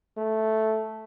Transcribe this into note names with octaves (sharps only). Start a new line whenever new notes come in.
A3